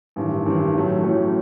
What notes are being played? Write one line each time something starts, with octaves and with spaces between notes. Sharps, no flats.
A1 G2 D#3
A1 G2 D#3
A1 A2 F#3 A3 C#4
A1 A2 F#3 A3 C#4